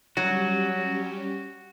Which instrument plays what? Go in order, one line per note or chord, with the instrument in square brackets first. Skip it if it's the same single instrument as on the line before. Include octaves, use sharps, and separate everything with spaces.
[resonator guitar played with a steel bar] F#3 [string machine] G3 C#4 G4 [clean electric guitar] F#4